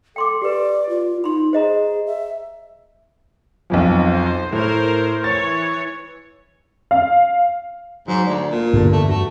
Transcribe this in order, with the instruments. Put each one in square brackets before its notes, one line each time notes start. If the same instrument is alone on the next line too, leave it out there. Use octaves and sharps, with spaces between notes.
[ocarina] A4 [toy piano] G5 C6 D6
[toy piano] G4 B4 [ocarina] D5
[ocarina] F4
[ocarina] D#4 [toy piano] B5 C6
[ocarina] G#4 [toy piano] C5 D#5 A#5
[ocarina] E5
[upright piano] B1 F2 F3
[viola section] C5
[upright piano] A2 [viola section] A#4 C5
[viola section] E3 C#5 [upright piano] A6
[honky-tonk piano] F5
[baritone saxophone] G#2 [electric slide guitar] F#3 C5
[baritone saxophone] D2 [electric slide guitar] D5
[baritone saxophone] A#2
[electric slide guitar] E2 D3 A5 [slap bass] G2
[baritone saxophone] A3
[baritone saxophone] A3 [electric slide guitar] F#4